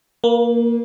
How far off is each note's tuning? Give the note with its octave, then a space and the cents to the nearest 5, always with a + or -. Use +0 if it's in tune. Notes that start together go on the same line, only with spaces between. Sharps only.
A#3 +0 A#4 +45